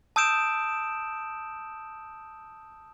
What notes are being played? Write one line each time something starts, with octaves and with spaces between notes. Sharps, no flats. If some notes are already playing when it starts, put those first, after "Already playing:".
A5 D#6 E6 G6 D7 E7